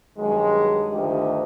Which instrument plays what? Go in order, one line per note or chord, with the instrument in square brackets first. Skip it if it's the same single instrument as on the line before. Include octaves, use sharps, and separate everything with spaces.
[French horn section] G2 B2 D#3 F#3 G#3
D2 G2 D#3 F3 G4 D#5